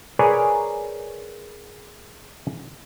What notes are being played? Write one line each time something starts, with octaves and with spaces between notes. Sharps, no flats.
G#4 A#4 B4 C#5 D5 G#5